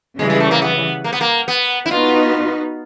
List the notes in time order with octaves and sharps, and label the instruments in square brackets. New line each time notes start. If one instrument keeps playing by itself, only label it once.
[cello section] C#3 E3 G3 [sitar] G#3
[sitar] G#3
A3
A#3
B3
A#3
B3
A#3
B3
E4
[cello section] B3 D#4 F#4 B4 D#5 [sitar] F4